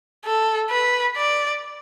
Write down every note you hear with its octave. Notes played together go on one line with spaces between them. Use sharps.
A4
B4
D5